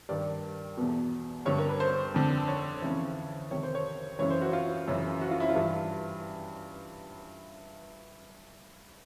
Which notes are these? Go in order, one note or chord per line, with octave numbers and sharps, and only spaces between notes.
G2 D#3 D5
E2 B2
G2 D3 C#5
A#4
B4
C5
F2 D3
C#5
F2 C#3 E3
F2 C3 D#3 C#5
C5
C#5
F#2 C#3 E3 C#5
C5
F#4
F4
F#2 C#3 E3
F#4
F4
E4
F4
G2 E3